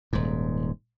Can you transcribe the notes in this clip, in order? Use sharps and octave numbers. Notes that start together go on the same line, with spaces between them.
D#1 G#2